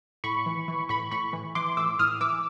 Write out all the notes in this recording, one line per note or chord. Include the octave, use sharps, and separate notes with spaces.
A2 B5 C#6
E3
E3
A2 B5 C#6
A2 B5 C#6
E3
E3 C6 D6
A2 D6 E6
A2 D#6 F6
E3 D6 E6